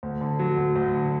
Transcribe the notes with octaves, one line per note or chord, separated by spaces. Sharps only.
D2
D3
F#3
D2
D2
D3